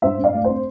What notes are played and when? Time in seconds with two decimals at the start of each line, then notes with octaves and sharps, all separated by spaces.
0.02 G2 C5 E5
0.18 G2
0.24 D5 F5
0.34 A3
0.44 C4 C5